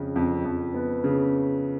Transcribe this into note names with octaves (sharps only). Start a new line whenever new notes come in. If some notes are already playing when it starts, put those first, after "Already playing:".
Already playing: F2 C#3
F2
F2
B3
C#3